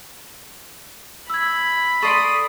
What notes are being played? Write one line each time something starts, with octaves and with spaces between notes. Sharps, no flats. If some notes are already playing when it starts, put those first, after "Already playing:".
B5 E6 G#6
A4 D5 C6 C#6 D#6 C7 D7